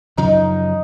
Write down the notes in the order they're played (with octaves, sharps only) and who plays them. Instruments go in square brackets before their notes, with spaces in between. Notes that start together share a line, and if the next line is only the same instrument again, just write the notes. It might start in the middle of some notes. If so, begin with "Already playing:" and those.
[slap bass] F#2 C#3 F3 [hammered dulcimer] D#4